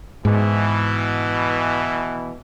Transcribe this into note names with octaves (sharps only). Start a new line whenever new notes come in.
G#2 B2 E3